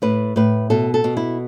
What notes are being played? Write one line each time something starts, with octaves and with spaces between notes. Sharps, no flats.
A2 B4
A2 B4
B2 A4
A4
B2
E4